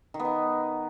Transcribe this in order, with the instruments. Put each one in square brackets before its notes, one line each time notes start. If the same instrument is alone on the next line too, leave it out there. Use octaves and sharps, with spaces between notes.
[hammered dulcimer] D#3
B3
D#4